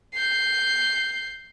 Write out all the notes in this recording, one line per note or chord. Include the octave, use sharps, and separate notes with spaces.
G6 C7